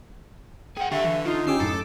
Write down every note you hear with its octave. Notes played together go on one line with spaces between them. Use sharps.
G#4 F#5 G5
D3 G4 E5 F5 C#6
E3
D#4 F4
C#4 G4 G#5 D6 E6 C7
F#2 A2 A4 D6